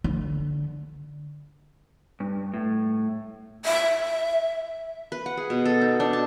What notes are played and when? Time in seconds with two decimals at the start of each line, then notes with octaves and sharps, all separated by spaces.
0.04 D3
2.20 G2
2.54 A2
3.65 E5
5.12 B4
5.26 F#5
5.37 G#4
5.50 B2
5.65 A4
5.81 D#4
6.00 D4
6.13 A5